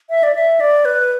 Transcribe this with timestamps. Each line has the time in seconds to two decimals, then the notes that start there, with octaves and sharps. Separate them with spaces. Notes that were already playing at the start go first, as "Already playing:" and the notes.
0.10 E5
0.23 D5
0.35 E5
0.60 D5
0.85 B4